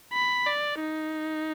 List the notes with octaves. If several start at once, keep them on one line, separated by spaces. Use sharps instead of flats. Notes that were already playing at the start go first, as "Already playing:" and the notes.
B5
D5
D#4